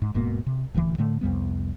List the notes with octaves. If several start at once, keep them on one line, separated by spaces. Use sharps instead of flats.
G#2
D#1 G#2 B2 A#3
C3
D#1 D2 D#3 E3
A2 D3 A3
C2 F2 G3 B3